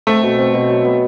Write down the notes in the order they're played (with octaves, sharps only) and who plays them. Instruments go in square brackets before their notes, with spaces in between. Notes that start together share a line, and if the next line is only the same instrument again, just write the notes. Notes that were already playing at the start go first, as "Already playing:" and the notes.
[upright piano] A3 [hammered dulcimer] C4
[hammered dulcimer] B2
C4
B2
F#3
B3